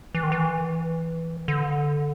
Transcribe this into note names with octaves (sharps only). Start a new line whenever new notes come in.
E3
D#3
E3
D3